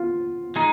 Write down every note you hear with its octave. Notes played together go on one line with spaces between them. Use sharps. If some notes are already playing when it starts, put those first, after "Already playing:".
Already playing: F4
G#3 D#4